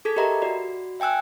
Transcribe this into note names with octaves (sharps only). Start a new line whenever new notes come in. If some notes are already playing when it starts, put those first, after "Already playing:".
G#4 A4 G#6 B6
G4 A#4 D#5 E5 A#5 B5
F#4 D5 B5
E5 G5 G#5 E6 F#6